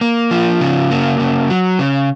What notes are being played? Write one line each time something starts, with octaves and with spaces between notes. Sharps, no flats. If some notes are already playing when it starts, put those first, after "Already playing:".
A#3
F3
C#3
A#3
C#3
F#3
C#3